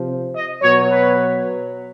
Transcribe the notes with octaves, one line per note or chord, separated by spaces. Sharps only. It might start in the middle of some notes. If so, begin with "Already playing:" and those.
Already playing: C3 F3
D#5
B2 F#3 C#5
B4